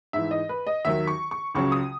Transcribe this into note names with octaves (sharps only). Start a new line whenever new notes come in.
G#2 E3 E5
D#5
B4
D#5
D#2 D#3 F#3 E5
C#6
C#6
C#2 C#3 F#3 C#6
D#6